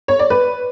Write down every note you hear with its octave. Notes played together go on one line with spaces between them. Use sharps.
C#5
D5
B4